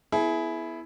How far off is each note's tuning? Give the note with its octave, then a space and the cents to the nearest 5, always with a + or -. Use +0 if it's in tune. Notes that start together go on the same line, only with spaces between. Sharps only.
B3 +0 E4 +0 G#4 +30